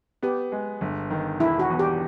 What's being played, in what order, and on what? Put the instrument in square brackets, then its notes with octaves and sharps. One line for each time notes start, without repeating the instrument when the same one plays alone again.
[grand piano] B3 [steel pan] G4
[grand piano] G#3
G1
D#3
[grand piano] E1 [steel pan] E4
[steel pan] F#4
[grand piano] E2
[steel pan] G4